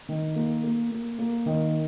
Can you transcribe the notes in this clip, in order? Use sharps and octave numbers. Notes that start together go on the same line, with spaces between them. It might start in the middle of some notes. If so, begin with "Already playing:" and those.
D#3
A#3
A#3
A#3
A#3
D#3